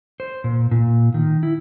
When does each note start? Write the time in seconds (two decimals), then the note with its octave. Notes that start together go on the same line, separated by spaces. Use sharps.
0.20 C5
0.44 A#2
0.71 A#2
1.14 D#3
1.43 E4